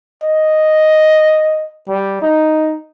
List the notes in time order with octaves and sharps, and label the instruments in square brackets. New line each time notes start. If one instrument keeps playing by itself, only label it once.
[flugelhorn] D#5
G3
D#4